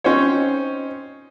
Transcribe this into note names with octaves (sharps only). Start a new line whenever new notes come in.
C4 C#4 D#4 C5 C#5